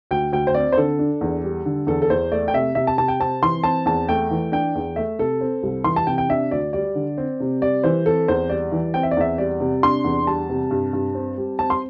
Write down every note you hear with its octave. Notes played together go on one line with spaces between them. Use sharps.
D2 G5
D2 G5
C5
C4 D5
C5
D3 A4
D4
E2
G3
D3
E2 A4
A4
E2 C5
A3 D5
G5
C3 E5
C3 E5
A5
C3 A5
G5
C4 A5
E3 C6
C4 A5
E2 A5
A3 G5
E3
D4 G5
E2
A3 E5
C3 A4
C4
C2
E3 C6
A5
C3 G5
G5
D4 E5
D2 D5
G3 D5
D3
C4
C3
G3 D5
E3 C5
C4 A4
E2 C5
G3 D5
E3
C4 G5
E5
D5
E2 E5
G3 D5
C3
D4 C6
E2
G3 A5
C3
G2
G2
C4
G3
C4 A5
C6